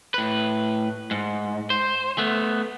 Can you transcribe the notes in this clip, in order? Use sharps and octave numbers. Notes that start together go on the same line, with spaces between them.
A2 B4
G#2
C5
A3 B3